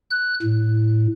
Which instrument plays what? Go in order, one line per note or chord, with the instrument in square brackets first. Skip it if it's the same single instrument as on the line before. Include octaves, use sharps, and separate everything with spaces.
[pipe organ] F#6
A2